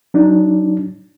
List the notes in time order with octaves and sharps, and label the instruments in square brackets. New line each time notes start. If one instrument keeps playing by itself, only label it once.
[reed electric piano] F#3 D4 D#4